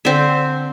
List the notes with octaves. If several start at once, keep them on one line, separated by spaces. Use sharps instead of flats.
D3 C4 E5